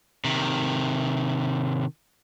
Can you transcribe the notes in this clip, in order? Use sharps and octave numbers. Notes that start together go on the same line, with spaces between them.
C3 D#3